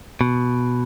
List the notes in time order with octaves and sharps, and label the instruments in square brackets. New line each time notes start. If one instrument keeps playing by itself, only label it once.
[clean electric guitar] B2